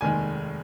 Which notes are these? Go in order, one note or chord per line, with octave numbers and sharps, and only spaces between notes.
F1 D#2 D#3 G#3 G#5